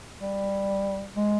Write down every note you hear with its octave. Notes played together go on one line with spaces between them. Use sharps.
G3
G#3